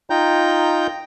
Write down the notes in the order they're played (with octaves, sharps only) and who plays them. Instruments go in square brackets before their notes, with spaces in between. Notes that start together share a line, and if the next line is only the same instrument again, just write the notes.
[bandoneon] D#4 F4 G5 A#5 G6